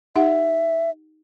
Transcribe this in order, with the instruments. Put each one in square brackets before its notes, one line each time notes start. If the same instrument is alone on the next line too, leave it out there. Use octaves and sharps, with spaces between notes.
[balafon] D#4 G4 F#5 [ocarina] E5